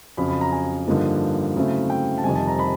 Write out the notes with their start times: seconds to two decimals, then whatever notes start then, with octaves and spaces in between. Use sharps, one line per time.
0.17 F2 C#3 F#3 B5
0.29 B5
0.41 A#5
0.52 G#5
0.87 G2 D3 F3 A#3 D#4
1.56 C#3 F#3 A3 C4 E4
1.90 G5
2.18 A5
2.24 F2 C3 D#3 G3 C4 G#5
2.35 A5
2.47 A#5
2.59 B5